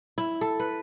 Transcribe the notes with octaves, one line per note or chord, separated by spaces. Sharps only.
E4
A4
B4